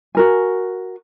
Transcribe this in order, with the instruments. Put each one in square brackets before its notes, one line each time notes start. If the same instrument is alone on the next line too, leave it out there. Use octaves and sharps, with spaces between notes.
[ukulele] F#4 A#4 G#5